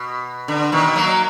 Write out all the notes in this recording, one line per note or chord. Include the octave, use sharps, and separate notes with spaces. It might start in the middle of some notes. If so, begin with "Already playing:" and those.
Already playing: B2
D3
B2 D#3
F#3 A#3